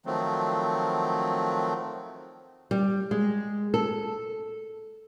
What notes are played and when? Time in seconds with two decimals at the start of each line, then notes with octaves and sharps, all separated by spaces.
0.06 D#3 F3 F#3 A3 C4
2.71 G3
3.11 G#3
3.74 A4